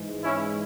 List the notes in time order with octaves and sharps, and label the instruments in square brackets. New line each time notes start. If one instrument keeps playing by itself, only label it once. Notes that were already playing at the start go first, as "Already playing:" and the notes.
Already playing: [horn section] G#2 E3 G#3
C#4 E4